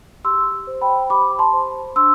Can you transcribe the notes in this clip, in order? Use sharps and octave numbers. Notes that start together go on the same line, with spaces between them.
G4 C6 E6
C5
G5 B5
G4 B5 D6
A5 C6
C5
D4 C6 E6